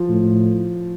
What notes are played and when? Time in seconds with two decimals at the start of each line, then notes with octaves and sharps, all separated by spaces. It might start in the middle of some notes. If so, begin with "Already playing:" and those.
Already playing: F3
0.09 A2